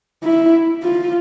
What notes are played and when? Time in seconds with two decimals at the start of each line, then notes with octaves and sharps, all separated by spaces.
0.24 E4
0.83 F4